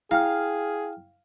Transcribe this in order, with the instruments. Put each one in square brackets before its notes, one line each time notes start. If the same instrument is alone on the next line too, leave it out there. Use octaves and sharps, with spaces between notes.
[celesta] E4 G5 F6 [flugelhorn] G#4 [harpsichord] F5